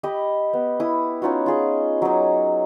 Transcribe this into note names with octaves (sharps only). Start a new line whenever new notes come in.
G4 D#5 B5
B3
E4 D#6
C#4 D#4 F4 F#4
F4 G#4 D#5
F#3 D#4